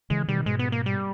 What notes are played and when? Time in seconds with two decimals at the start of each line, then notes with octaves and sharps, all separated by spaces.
0.10 C#3 E3 G#3
0.28 B2 D#3 G3
0.46 G#2 B2 G#3
0.59 B3
0.72 A#3
0.86 G3